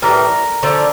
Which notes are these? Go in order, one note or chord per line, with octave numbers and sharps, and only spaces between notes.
A2 E3 G3 A#4
D3 F3 A3